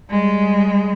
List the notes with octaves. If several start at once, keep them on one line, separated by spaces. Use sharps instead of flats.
G3 G#3